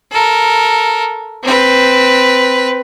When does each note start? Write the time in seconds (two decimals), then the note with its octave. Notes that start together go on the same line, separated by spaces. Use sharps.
0.12 A4 A#4
1.43 C4 B4